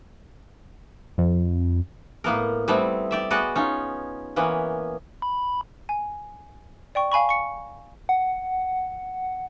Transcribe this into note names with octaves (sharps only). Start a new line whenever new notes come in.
F2
A2 A#3 B3 A#4
G3 A3 B3 C4 E4
G4 D5 E5
B3 F#4 G#4 B4 D5 D#5
C#4 D#4 F4
E3 A#3 B3 C#4
B5
G#5
D5 G5 C#6
F5 G#5 B5 C#6
C#6 C#7
F#5